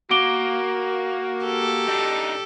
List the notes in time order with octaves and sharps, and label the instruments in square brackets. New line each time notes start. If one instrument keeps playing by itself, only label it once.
[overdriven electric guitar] A#3 [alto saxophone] F#4 [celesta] D6 D7 G7
[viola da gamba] G4 A4
[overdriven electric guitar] D4 D#4